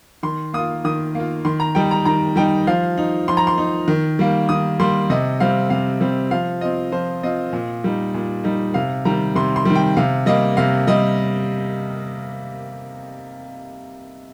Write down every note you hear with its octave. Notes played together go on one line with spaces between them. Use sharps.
D#3 C6
A#3 F4 D#6
D#3 D#6
A#3 F4
D#3 C6
A#5
G3 D#4 G5
A#5
D#3 A#5
G3 D#4 G5
F3 F5
D#4
F3 C6
A#5
C6
D#4
D#3
G3 A#3
D#3 D#6
G3 A#3 C6
C3 D#5
G3 C4 F5
C3 F5
G3 C4
F3 F5
C4 F4 D#5
F3 C5
C4 F4 D#5
A#2
G3 D#4
A#2
G3 D#4
C3 F5
D#3 G3 A#5
C3 C6
C6
D#3 G3
G5
C3 F5
G3 A#3 D#5
C3 F5
G3 D#5